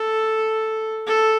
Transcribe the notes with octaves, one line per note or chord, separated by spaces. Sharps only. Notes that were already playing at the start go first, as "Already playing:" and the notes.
Already playing: A4
A4